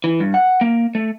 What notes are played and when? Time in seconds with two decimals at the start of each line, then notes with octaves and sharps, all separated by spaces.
0.04 E3
0.20 G2
0.34 F#5
0.61 A#3
0.95 A3